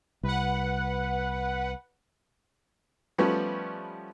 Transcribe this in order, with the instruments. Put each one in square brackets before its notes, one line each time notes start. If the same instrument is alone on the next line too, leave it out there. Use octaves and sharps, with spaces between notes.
[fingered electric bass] C2 [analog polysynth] B4 F#5
[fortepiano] F3 G3 A3 B3 C#4